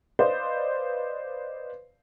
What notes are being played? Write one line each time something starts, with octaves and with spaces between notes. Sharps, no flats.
B4 C5 D5 D#5 F5